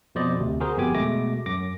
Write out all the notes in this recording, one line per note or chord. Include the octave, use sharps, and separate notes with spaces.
F2 B2 C5 D5 D#5
D2 C3
F#4 G#4 A#4 C5
G1 F2 B3 G4 G#5 D6
B2 G#3 A3 D6 A#6
F#2 D6 A#6